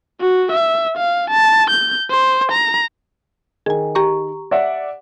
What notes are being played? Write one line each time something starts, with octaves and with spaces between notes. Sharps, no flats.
F#4
E5
F5
A5
G6
C5
A#5
D#3 G#4 G#5
G4 A#5 C#6
D5 E5 F#5